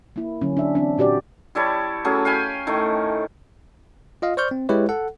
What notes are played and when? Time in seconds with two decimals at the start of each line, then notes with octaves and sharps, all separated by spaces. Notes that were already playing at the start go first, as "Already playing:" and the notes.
0.16 A#3 E4
0.41 D3 F#3 C#4
0.57 D4 E5
0.75 E3 C4 D4
0.98 A#2 F#4 G4 D5
1.55 G3 E4 C#5 A5
2.04 F#3 A3 C#4 G#4
2.25 F5 G5 G#5 B5
2.67 A2 D#3 A3
4.22 F4 D#5 F5
4.37 C5 D5 C#6 F6 G6
4.51 C4
4.69 G#3 E4 G4 B4 C#5
4.89 A4 F#5